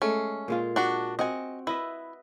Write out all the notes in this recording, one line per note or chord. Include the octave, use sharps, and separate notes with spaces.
G#3 A3 C#4
A#2 G#3 F4
D4 F#4
C4 F#4 D#5 F#5 G#5
E4 B4 D#5 E5